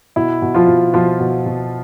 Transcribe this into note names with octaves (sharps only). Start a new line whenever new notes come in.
B2 E4
B2
F3 F4
B2
B2 F3 F4
B2
B2